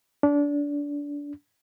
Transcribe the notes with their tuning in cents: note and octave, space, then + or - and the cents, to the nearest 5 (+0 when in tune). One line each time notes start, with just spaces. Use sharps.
D4 -25